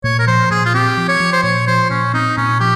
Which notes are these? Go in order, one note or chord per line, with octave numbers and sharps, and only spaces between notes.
A#2 C#5
A#4
F3 C5
A#2 G#4
F4
C4 G4
F3
C#5
F3
C5
A#2 C#5
F3 C5
A#2 C#4
C4 D#4
A#2 C#4
F3 G4